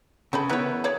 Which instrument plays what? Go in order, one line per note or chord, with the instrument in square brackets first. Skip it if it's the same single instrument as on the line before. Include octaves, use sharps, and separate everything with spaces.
[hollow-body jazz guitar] C#3 [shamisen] A3 A4 B5
[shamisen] D#3 C#5 [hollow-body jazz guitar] E3 B3
[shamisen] G#4 C#5 D5